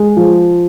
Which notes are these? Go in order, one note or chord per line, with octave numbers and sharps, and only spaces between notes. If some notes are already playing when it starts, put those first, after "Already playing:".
Already playing: G#3
F3